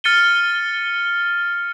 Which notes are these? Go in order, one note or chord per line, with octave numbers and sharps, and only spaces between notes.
F6 A6 C#7 D#7 G7